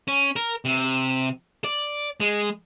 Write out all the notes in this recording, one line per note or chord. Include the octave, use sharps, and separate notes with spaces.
C#4
A#4
C3
D5
G#3